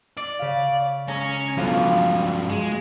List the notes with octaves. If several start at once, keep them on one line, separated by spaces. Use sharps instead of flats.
D5
C#3 F5
G#3 C#4 A#5 A#6
B1 G2 F3 F5 C6
G#3